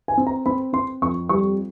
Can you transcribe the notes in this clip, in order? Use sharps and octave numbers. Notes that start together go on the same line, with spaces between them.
G#5
C4
A#5
C4 B5
C4 C6
F2 C#6
G3 C#6